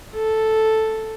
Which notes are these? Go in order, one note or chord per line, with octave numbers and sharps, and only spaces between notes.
A4